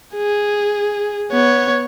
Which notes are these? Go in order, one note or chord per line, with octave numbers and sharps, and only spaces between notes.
G#4
B3 C#5